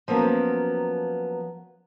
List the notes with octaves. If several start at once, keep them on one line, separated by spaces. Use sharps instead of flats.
F3 F#3 A#3 B3 C#4